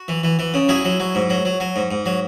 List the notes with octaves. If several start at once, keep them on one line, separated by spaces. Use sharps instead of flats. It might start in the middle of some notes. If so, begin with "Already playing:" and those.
Already playing: F#4
E3
E3
E3
C#3
F#3 E4 G#4
F#3
F#3
G#2
F#3
F#3
F#3
G#2
G#2
F#3